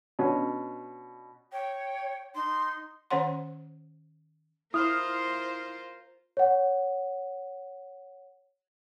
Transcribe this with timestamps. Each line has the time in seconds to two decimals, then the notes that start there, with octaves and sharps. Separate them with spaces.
0.19 B2 C#4 D4
1.52 C#5 G5
2.35 D#4 C6
3.10 D#3 C#4 C5 C#5 F#5 C6
4.74 E4 F4 A#4 C5 D#6 F6
6.37 C#5 F#5